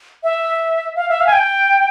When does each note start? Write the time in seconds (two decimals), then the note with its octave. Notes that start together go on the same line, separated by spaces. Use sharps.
0.23 E5
0.96 F5
1.09 E5
1.21 F5
1.27 G#5
1.33 G5